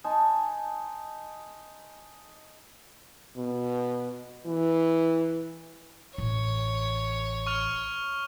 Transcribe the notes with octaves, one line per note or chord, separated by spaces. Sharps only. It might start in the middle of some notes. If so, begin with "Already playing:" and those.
D#4 C5 G#5 A5
B2
E3
A1 C#5
C#6 F6 F7